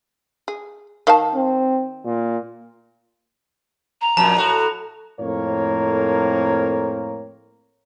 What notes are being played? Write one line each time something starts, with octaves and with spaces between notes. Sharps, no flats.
G#4
D#3 F5 A5
C4
A#2
A#5
F2 A#2 A5
A2 F#4
F2 A2 A#3 C4 A#4 C#5